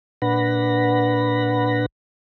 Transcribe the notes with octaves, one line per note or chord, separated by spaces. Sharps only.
A#2 D4 B4 F#5 B5 A#6